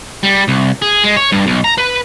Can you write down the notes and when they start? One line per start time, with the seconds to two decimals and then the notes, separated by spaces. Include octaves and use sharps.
0.23 G3
0.48 C2
0.82 G#4
1.04 G#3
1.17 C#5
1.32 G2
1.47 B1
1.64 A#5
1.78 B4